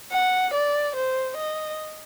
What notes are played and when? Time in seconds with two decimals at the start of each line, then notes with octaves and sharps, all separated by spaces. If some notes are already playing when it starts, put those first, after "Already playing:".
0.12 F#5
0.54 D5
0.96 C5
1.37 D#5